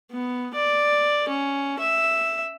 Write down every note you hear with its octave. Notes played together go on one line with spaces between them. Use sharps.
B3
D5
C#4
E5